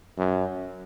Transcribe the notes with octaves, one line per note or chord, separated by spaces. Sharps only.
F#2